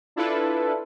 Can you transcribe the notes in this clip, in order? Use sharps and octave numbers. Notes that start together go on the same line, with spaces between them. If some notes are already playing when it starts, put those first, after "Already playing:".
D4 E4 F4 A4 B4